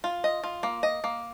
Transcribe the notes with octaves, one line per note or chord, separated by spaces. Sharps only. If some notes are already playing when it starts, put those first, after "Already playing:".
F4
D#5
F4
A#3
D#5
A#3